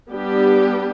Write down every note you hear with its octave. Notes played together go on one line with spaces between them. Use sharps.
G3 B3 D4 G4